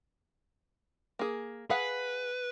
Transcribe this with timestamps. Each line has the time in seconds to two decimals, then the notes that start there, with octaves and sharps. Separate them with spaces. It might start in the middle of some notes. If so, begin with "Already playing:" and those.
1.19 A#3 G#4
1.70 G#4 B4 F5 F#5